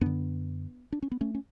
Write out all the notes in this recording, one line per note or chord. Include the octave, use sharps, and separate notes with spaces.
F#2 D3 B3 D4
D4
C#4
B3
A3 C#4
C#4